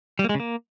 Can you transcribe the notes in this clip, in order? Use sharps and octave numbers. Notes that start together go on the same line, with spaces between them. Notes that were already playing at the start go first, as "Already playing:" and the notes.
G3
A#3
G#3
C#3
A#3